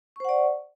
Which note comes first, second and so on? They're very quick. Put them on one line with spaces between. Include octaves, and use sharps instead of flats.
C#6 C5 F#5 D5